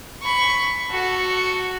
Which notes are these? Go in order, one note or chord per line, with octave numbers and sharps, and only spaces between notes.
B5 C#6
F#4 A4